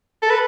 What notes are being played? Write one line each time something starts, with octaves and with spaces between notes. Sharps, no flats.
A4
B4